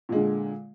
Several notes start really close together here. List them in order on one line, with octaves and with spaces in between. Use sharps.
A#2 G#3 D3